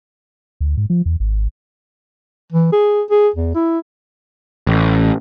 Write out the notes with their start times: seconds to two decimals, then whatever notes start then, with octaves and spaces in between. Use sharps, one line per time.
0.61 D2
0.77 G#2
0.90 F3
1.06 E2
1.20 G#1
2.52 E3
2.72 G#4
3.10 G#4
3.36 E2
3.55 E4
4.67 A1